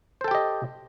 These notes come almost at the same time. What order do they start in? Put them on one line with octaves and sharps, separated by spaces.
C5 A4 G5 G4 D#5